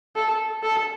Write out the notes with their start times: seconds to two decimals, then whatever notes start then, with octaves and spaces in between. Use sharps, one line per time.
0.16 A4
0.63 A4